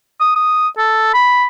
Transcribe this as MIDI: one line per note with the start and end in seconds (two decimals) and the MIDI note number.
0.21 0.33 87
0.36 0.68 87
0.78 1.09 69
1.14 1.46 83